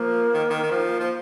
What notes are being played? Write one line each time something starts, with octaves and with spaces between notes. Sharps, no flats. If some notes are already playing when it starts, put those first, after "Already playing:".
Already playing: F3 A#3
D#3
D#3
D#3
F3
F3